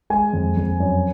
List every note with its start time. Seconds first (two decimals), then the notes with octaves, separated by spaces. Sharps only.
0.10 G#3 G#5
0.33 F2
0.57 F2
0.80 F#2